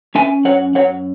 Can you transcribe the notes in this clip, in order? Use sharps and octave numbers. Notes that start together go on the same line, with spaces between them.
C#4 E5 G#5
F#2 C#5 F#5
F#2 C#5 F#5